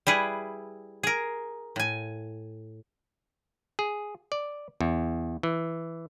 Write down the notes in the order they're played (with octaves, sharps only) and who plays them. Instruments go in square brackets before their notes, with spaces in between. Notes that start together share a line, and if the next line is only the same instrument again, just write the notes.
[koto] G3 E4 G#4 B4
G#4 A#4
A2 G#5
[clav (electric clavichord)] G#4
D5
E2
E3